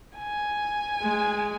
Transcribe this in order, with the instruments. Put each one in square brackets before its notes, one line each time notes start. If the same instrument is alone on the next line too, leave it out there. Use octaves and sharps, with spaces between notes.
[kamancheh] G#5
[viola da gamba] G#3